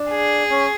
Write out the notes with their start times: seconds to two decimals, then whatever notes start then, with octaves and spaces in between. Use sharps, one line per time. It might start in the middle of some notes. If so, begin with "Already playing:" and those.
Already playing: D4
0.11 G#4
0.51 C#4